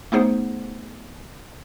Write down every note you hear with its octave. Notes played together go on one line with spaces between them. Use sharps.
A3 B3 D#4 G#4 C5 F#5